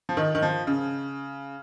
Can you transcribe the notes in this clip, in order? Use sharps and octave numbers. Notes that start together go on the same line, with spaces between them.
F3
D#3
D#3
F3
C#3